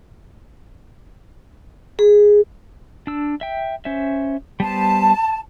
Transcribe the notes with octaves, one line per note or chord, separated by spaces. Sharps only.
G#4
D4 E6
E5 G5
C#4 C5 E5
G3 B3 C5 A5